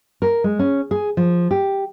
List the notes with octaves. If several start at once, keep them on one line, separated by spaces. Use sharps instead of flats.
A#4
G#3
C#4
G#4
F3
G4